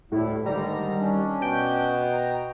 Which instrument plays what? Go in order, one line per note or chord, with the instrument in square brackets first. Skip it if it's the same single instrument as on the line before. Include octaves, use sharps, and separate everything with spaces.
[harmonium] D2 G3 E4 [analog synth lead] A2
[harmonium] G#2 D3 A#5 [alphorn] D#3 [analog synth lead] G3
[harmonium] C#4 D4
[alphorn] B2 [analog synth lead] G5
[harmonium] A#5